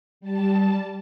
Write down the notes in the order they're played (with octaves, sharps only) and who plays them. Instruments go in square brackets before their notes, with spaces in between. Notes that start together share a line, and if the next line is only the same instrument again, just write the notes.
[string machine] G3 A5